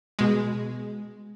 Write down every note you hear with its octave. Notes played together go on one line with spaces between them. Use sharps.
B2 G#3